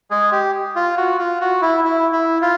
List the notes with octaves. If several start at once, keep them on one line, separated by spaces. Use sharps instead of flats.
G#3 G#4
G4
F4
F#4
F4
F#4
E4
E4
E4
F4